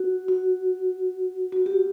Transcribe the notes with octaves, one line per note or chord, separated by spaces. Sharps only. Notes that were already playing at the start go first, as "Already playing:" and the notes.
Already playing: F#4
F#4
F#4
G4